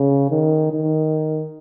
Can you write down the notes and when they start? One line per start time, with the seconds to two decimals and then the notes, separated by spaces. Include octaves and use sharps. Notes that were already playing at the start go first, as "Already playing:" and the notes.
Already playing: C#3
0.31 D#3
0.72 D#3